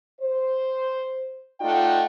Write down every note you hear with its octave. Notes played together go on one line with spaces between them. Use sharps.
C5
A3 D#4 F4 D5 F#5 G5